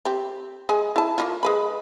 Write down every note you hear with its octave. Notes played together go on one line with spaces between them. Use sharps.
C4 G4
G#3 G#5
E4 A5
A#3 C#4 F4
G#3 B4 B5